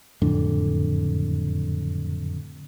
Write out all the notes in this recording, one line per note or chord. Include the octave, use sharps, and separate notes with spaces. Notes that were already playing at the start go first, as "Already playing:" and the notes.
F#1 F2 A2 D3